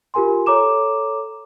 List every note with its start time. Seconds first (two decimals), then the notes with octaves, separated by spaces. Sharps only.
0.14 F4 G4 A#4 G#5 C6
0.46 A4 C#5 A#5 D6 E7